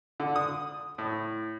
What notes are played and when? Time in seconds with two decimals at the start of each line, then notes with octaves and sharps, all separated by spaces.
0.20 D3
0.36 D#6
0.98 A2